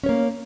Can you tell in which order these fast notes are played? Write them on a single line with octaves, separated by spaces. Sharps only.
C#4 C#5 A#3